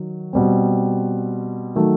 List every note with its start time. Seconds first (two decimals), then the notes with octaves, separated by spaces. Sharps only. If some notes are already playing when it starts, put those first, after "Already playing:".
Already playing: D#3 F#3
0.33 B2 G3 C4
1.75 D#3 F#3 A3